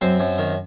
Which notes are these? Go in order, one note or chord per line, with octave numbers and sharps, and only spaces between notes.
F#2 C4 C5
F#2
D#3